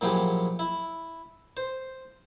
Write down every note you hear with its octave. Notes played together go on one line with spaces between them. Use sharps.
A#2 F3 F#3 E4 G4 G#4
E4
C5